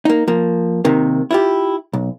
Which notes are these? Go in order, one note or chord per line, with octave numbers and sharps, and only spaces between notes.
A#3 D#4
F3 A#3
C3 D#3 A#3
E4 F4 G4
B1